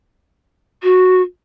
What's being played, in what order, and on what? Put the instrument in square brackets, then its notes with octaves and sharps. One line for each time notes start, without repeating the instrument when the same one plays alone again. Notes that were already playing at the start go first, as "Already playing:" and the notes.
[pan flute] F#4